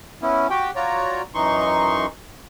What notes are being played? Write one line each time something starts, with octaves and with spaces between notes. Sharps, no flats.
B3 C#4 E4
F#4 G4 G5
F4 F#4 C#5 D5 A#5
F#2 E3 D#4 C6 C#6